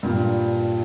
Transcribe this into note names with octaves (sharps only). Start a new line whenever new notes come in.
G2 A#2